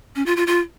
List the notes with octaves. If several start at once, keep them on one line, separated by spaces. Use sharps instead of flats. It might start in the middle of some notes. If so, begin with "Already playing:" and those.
C#4
F4
F4
F4